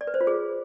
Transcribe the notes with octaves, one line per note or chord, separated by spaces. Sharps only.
D5
B4
C5
F4
G#4